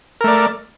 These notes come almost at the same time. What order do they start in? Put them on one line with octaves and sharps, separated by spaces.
A#4 A3 D5